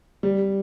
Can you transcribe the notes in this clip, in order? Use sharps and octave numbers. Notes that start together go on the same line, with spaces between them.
G3